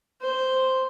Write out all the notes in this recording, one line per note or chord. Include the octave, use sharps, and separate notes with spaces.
C5